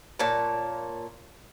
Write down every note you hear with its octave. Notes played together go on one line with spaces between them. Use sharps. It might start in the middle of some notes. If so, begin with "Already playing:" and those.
A#2 C#5 A5